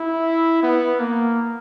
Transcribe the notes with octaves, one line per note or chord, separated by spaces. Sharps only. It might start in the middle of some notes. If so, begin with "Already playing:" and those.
Already playing: E4
B3
A#3